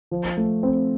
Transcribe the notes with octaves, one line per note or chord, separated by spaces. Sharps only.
F3
A3
C4